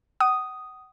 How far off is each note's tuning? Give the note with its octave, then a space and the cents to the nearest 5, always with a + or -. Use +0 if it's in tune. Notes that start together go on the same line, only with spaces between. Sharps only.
F#5 +35 D#6 +0